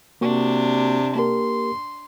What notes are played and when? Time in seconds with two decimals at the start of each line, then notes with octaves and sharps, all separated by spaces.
0.21 C3 A#3 D4 F#4 C#6
1.15 A#3 G4 A#4 C6